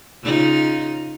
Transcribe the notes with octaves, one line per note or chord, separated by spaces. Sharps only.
C#3 D#4 F4